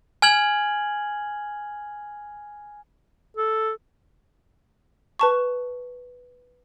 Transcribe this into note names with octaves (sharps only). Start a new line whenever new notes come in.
G#5 F6 G#6 F#7
A4
B4 A5 C#6